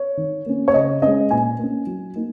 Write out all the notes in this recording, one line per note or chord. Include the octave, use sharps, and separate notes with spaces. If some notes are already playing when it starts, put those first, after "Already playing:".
Already playing: C#5
D#3
A#3 C#4
C#5
C#3 D#5
G#3 C#4 D#5
A#2 G#5
A#3 C#4
F#3
A#3 D#4